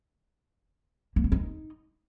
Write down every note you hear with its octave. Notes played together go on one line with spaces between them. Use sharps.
A#3
E4
D#4